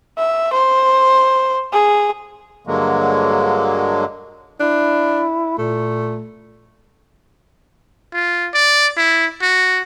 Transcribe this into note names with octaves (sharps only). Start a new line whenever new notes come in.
E5
C5
G#4
G2 D3 F#3 G#3 A#3
D4 E4
A#2 A3
F4
D5
E4
F#4